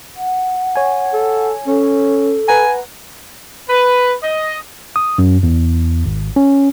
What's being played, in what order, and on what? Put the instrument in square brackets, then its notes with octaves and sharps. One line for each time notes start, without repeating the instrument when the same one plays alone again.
[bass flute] F#5
[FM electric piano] C#5 G#5
[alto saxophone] A4
[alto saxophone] C#4 [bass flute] A4
[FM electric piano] B4 F#5 A#5 [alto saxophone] G#5
[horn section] B4
D#5
[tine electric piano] D#6
F#2
E2
G#1
C#4